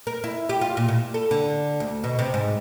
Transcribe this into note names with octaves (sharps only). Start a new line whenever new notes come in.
A#4
E4
G4
F4
A#2
A#2
A4
D3
D2
B2
C3
G#2